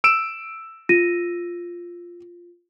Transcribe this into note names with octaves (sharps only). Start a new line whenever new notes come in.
E6 D7 E7
F4 A#6 D#7